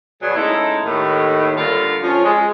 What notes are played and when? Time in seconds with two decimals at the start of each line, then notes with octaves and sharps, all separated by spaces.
0.22 G2 B2 F#3 B3 G#4
0.36 G#3 A3 C#4 D#4 E4
0.84 D#2 A2 D#3
1.57 D3 G3 A3 F4 A4 A#4
2.02 F3 C#4 F4
2.24 G#3